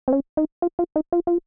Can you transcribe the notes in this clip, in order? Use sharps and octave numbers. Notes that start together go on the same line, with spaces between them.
C4
C#4
D#4
F4
F4
D#4
F4
F4